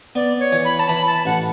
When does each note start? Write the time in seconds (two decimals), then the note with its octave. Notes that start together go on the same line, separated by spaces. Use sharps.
0.15 B3 D5
0.40 C#5
0.52 E3
0.65 B5
0.80 A5
0.89 E3 B5
1.07 A5
1.26 A1 F#5